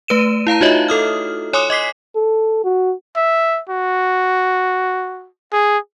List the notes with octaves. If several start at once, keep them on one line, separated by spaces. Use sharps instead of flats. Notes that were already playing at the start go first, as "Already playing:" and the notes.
A3 B4 D#7 E7
E4 F5 A5 A#5
D#4 F4 F#4 C#5 D#5 E5
A4 D#6 F6
C#5 G#5 C6 D6 D#6
D#5 D6 B6 C7
A4
F#4
E5
F#4
G#4